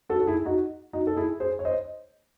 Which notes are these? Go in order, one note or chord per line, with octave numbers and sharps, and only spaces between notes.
F#4 A4
A4
E4 G#4
D#4 F#4
D#4 F#4
A4
E4 G#4
G#4 C5
C#5
C5 D#5